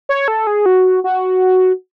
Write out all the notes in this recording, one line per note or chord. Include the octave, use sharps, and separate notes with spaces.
C#5
A4
G#4
F#4
F#4